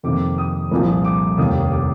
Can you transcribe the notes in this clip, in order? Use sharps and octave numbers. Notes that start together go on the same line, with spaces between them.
F2 C3 D#3 A#3 D6
D#6
C2 A#2 F3
D6
F1 D#2 D#3 A#3 D#6
D6